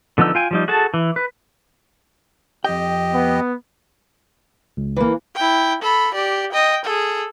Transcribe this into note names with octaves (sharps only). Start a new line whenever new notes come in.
D3 F3 B3 D#4 E6
F4 G5 G#5
F3 G3 D#4
F#4 G#4 A4 A5
E3
B4
F2 G4 D#5 G5
B3
C#2
E3 A#3
E4 G5
A4 B5
G4 D5
D#5 G5
G#4 A4